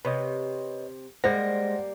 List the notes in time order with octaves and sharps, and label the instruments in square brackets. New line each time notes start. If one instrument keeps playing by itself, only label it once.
[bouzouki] C3 [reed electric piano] B4 C#5 D#5
[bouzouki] G3 A#3 [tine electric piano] G#3 A#6 [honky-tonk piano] C5 [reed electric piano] F#5